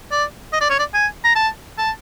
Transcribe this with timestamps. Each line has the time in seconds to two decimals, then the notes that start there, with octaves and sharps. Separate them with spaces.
0.11 D5
0.53 D#5
0.61 D5
0.70 C#5
0.79 D5
0.94 G#5
1.24 A#5
1.35 A5
1.78 A5